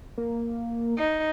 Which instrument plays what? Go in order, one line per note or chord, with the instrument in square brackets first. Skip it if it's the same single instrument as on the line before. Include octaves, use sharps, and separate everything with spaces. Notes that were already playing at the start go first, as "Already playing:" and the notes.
[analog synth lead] A#3
[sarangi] D#4